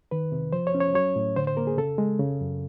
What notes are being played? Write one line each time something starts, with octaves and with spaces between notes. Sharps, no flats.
D#3 B4
C3
F3 C5
C#5
C#4
C#5
F#3 C#5
A2
D3 C5
C5
A#3 A#4
G#4
C#3 A4
G#3
C#3
F#2